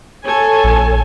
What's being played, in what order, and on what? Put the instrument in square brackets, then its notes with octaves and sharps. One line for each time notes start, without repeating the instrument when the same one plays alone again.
[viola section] A4 C#5 G#5
[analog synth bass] A#1